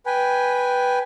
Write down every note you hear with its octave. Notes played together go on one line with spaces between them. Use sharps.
B4 G5 G#5